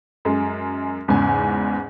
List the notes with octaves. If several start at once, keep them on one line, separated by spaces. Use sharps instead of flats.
F#2 G#3
E2 G#2 C#3 G#5